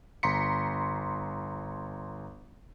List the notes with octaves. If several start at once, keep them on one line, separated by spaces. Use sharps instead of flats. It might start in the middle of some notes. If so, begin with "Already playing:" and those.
G1 A#5 C6 B6 C#7